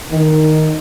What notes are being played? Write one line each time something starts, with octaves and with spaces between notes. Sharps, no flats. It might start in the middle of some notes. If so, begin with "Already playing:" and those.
D#3